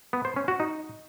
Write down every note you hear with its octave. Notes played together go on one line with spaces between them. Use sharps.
B3
C5
C#4
F#4
D#4